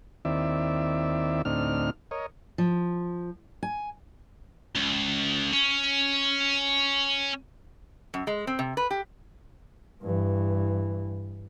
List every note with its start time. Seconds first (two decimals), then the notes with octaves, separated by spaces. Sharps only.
0.25 D#2 D#3 C4 E4 D5 E5
1.45 D2 A2 C4 D4 D#4 F6
2.11 A#4 C#5 D#5
2.58 F3
3.63 G#5
4.76 C#2
5.53 C#4
8.14 F#2
8.27 G#3
8.47 C4
8.59 C3
8.77 B4
8.91 G4
10.02 G2 E3